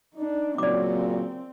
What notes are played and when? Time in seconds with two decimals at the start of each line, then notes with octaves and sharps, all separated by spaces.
0.15 D4 D#4
0.58 A#2 C#3 F#3 C4 D5 D6